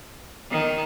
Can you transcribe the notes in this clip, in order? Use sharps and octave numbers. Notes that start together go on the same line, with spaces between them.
D#3